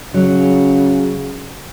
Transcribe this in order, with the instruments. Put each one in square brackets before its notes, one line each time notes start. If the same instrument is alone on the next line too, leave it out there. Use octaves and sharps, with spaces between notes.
[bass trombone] C#3 [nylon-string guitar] F#3